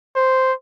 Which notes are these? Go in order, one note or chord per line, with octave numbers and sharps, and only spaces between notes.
C5